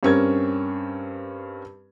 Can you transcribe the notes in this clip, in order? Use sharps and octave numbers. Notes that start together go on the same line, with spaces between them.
G2 C4 C#4 A#4 G#6